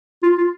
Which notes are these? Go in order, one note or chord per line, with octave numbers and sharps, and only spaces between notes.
F4
F4